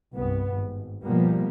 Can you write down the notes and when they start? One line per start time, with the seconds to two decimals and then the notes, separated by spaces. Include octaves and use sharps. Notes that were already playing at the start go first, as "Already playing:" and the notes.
0.14 C2 G2 B3
0.55 G#1
1.03 B2 F3 G3 A#3 B3